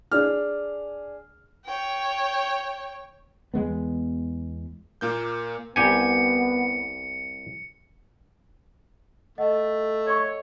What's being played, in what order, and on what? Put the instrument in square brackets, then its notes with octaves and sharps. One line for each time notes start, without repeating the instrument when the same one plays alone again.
[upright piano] D4 G#4 F6
[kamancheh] C#5 G5
[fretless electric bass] E2 G#3 B3
[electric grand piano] A#2 A#3 G6
[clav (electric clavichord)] C2 G4 G#5 [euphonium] B3 [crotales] C#7
[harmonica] A3 [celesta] D#5 F#5
[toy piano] A4 C#6 [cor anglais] C#5